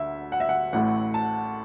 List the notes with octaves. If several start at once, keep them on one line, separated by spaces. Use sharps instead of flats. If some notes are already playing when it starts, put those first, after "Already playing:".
Already playing: D2 D3 E5
F#5
E5
F#5
A1 A2 A3 F#5
A5